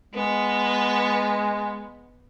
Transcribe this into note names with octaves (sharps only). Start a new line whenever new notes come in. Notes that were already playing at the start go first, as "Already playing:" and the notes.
G#3 B3